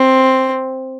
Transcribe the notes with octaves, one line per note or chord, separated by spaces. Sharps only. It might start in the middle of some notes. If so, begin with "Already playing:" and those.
Already playing: C4